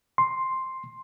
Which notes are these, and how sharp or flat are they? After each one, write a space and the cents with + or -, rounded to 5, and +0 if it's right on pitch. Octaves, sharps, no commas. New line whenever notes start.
C6 +5